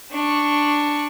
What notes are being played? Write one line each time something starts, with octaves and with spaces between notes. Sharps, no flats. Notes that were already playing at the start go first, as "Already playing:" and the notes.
D4 C#6